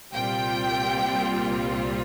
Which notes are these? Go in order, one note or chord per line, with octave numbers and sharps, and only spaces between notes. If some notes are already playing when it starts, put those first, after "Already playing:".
C2 A#2 G3 C4 F4 G5